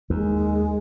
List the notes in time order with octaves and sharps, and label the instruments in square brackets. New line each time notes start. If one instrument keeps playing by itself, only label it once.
[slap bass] D#2 [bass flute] G#3